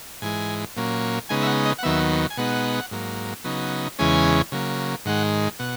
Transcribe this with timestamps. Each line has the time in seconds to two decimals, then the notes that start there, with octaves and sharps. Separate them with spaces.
0.22 G#2 E3 G#3 G#5
0.76 A#2 F#3 A#3 C#4
1.29 C#3 G#3 B3 D#4 G#5
1.42 E5
1.47 F#5
1.65 D#5
1.79 F#5
1.83 D#2 D#3 F#3 B3 E5
2.30 G#5
2.37 B2 G#3 B3 D#4 F#5
2.91 G#2 F#3 A#3
3.44 C#3 F#3 B3 D#4
3.99 E2 C#3 E3 G#3 C#4 G#5
4.52 C#3 F#3 A#3
5.05 G#2 D#3 G#3 F#5
5.59 B2 F#5